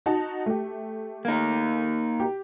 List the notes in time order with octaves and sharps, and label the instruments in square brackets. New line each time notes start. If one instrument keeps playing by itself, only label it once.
[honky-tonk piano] D#4 F#4 A5
A3 G4
[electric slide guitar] A#3 D#4
[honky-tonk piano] G4